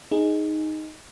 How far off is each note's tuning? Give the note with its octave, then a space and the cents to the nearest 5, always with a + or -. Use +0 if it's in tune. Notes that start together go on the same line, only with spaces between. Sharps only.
D#4 +0 G#4 +0